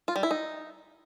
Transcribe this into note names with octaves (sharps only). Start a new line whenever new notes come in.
F4
G3
E4
D#4